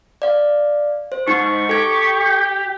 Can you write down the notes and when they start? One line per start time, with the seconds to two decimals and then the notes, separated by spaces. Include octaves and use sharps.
0.22 D5 F5
1.12 C5
1.28 G#2 D#4 C#6
1.69 G4 A4 G#6